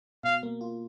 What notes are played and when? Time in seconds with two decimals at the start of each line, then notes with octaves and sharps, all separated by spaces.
0.24 B2 F5
0.43 A#3
0.61 F4